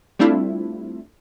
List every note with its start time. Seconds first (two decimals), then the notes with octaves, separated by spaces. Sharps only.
0.19 G3 A3 C4 D4 E4 F4